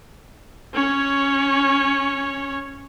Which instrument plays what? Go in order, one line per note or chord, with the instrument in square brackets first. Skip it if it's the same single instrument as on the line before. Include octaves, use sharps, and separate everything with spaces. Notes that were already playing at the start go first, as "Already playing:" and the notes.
[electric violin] C#4 C#5